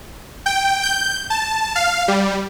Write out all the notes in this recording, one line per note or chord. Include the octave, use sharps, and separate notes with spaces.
G5
G6
A5
F5
G3